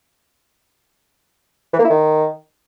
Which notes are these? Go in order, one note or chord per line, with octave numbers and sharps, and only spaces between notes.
E3
A#3
E4
D#3